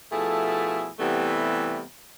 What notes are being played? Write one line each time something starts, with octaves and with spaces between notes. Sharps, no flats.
B2 F3 A3 E4 G#4 A4
C3 E3 G3 A3 B3